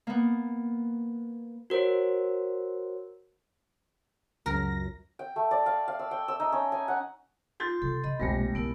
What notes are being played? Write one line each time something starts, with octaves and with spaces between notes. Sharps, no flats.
A#3 B3
F#4 A#4 C5 C#5
C#2 F#2 A#4 A#6
G5
A3
D5
F5
F5
E6
G5
E6
D#4
C#4
G#5
F#5
D#4 F4 C6 G6 A6
C3 B3 A4
C3 D#5 B5
F1 B1 F2 G3 G#3 A#3 G4 A#6
B1 B3 E4 A#4